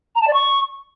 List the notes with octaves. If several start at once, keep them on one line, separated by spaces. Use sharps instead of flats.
A#5
A5
D5
C#6